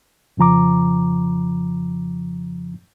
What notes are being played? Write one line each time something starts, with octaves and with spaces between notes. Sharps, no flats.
F2 C#3 F3 A#5 D6